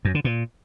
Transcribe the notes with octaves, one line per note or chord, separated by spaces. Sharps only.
F#2
D3
A#2